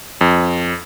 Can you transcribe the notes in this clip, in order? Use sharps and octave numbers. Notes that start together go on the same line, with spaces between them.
F2